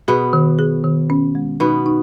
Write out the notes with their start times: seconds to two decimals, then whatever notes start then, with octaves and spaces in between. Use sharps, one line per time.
0.08 B2 B3 G#4
0.33 D#3
0.59 G#4
0.84 D#3
1.10 C#4
1.35 G#3
1.60 B2 B3 D#4
1.86 D#4